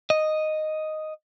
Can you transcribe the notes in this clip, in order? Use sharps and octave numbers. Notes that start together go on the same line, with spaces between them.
D#5